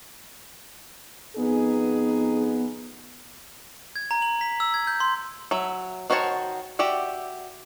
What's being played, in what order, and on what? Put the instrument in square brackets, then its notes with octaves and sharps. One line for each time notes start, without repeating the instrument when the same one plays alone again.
[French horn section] F2 D#4 G#4 [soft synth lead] B3
[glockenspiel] G#6
A#5
F#7
B6
E6
G#6
G6
C6
[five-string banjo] F#3 E5
D#3 F#4 C5 C#5 A5
F#4 G4 D5 E5